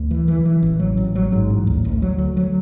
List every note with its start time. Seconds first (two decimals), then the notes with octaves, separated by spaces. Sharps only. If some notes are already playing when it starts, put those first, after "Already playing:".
Already playing: D2
0.11 E3
0.28 E3
0.45 E3
0.63 A1
0.80 F#3
0.97 A1
1.15 F#3
1.32 G#2
1.50 A1
1.67 D2
1.85 D2
2.02 F#3
2.18 D2
2.37 F#3